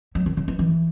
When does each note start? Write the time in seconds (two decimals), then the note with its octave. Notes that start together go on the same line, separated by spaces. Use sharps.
0.15 F#3
0.26 D#3
0.37 C#3
0.48 E3
0.59 E3